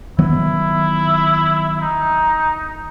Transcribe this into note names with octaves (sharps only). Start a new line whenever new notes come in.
D#3 F#3 B3 E4
D#4